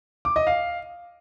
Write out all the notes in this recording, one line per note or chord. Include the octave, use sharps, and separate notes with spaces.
D6
D#5
F5